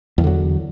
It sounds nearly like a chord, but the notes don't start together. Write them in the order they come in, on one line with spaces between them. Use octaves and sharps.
E2 E3 D3 F#3